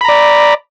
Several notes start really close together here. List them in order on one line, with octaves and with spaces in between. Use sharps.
B5 A#5 D5